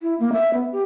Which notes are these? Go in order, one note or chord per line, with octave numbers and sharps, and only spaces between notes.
E4
A#3
E5
B3
G4